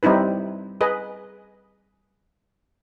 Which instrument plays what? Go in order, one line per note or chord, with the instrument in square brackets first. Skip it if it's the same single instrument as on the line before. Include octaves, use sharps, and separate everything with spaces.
[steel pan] G3 C4 D#4 E4 B4
G#4 B4 D#5